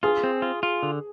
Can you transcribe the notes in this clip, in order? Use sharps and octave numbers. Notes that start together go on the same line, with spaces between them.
F4 G#4
C4
F4
F4
D3